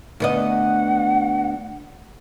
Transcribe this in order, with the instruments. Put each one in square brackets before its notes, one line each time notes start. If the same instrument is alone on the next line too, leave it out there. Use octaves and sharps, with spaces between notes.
[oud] D2 B3 D#5 [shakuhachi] F#5